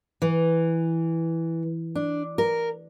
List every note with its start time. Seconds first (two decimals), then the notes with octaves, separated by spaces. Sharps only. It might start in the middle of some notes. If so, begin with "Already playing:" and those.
0.22 E3
1.95 D4
2.38 A#4